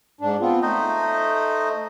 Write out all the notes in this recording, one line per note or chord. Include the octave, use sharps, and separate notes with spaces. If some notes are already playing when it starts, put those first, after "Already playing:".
G#2 D4
B3 C4 F4
A3 D#4 C5 D#5